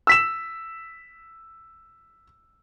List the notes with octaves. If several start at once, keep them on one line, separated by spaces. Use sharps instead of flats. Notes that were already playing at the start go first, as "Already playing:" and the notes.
E6 B6 E7